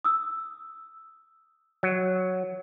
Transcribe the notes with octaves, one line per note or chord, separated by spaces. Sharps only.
D#6 E6
F#3